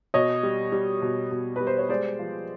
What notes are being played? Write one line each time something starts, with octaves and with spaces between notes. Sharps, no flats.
B2 C#5 D#5
G3
G3
B2
B2
G3 B4
C5
C#5
G#3 C5 D5
F3